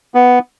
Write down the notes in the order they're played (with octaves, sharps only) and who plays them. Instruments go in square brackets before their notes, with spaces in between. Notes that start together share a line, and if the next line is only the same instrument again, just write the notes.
[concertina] B3